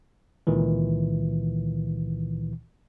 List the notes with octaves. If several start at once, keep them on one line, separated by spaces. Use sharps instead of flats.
C#2 A#2 D#3 E3